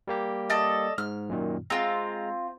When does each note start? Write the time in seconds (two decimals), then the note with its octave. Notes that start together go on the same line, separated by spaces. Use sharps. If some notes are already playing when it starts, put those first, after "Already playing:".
0.07 G3 A#3 G4
0.50 A4 D5 D#5
0.98 G#2 F6
1.29 F#2 A#2 D#3
1.70 G#3 C4 F4 A#5